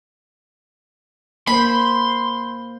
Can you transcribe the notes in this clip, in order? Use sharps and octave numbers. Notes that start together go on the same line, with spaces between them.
A#3 C5 B5 C6